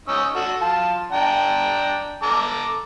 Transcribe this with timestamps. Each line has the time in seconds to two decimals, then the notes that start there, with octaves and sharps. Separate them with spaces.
0.08 C#4 D#4 E6
0.35 F#4 A4
0.61 F4 A5
1.13 D4 G5 A#5
2.23 A4 A#5 D6